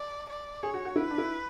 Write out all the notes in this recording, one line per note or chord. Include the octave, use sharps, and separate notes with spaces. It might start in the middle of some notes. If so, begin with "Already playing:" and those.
Already playing: D5
D5
G#4 C#5
F#4
F#4
E4 B4
D4
E4